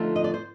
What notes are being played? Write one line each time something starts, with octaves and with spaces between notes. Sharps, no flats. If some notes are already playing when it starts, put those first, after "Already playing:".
Already playing: D3 F3 A3 D#4
D#5
D5
C5